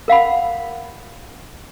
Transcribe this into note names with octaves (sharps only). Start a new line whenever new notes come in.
A#4 F5 F#5 B5